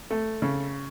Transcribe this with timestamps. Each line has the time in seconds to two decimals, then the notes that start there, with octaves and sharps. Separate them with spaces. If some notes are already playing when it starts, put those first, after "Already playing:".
0.11 A3
0.42 C#3